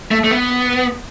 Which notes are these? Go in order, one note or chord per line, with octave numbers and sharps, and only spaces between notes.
A3
A3
B3